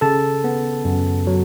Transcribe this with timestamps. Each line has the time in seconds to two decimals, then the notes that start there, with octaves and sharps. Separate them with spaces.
0.01 C#3 A4 A5
0.44 B3
0.85 F#2
1.27 F#3